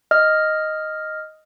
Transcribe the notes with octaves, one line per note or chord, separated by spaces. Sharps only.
D#5 F6